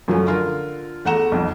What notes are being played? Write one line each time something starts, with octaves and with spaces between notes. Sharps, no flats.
F#2 F3 F#3 A3 C#4
D3 F4 A#4
E2 A3 F#5 A#5 E7
B1 F2